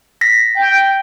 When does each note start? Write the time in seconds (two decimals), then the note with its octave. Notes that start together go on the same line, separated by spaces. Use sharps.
0.21 A#6 B6
0.56 G5